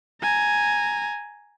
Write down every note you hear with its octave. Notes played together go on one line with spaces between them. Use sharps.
G#5 A#5